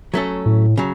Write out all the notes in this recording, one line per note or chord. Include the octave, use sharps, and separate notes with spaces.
F#3 A3 C#4 A4
A2
C#3 F#3